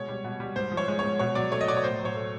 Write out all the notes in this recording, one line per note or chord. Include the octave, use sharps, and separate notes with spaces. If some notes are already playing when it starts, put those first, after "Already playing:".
Already playing: B2 G#3 C#5
G3
B2
G3
G#2 C5
F3
C#5
G#3
G#2 C#5
B2 C#5
F#3 D5
A3 C#5
D#5
B2 D5
C#5
A2 C5
F#3
C#5
A3